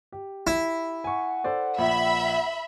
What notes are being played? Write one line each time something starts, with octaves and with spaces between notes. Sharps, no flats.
G4
E4
F#5 G#5 C#6
A4 C5 D5
A#1 E5 B5